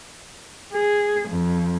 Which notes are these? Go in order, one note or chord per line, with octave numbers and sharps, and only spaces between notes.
G#4
F2